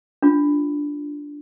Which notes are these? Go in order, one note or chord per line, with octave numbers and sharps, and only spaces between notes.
D4 F4